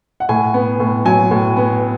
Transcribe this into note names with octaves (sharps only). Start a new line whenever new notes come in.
F#5
A2 G#5
B3
A2
F#3 G#5
A2
B3